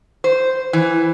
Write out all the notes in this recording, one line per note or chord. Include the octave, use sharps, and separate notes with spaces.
C5
E3